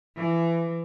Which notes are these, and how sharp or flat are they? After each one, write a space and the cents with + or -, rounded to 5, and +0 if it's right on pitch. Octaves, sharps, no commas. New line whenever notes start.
E3 +25